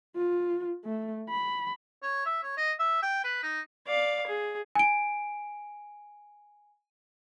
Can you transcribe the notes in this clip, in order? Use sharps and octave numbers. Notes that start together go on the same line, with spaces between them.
F4
A3
B5
C#5
E5
C#5
D#5
E5
G5
B4
D#4
D5 F5
G#4
G#5 D7